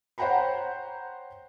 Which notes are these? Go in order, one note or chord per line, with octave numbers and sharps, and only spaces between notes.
C5 C#5 F#5 G5 A#5 B5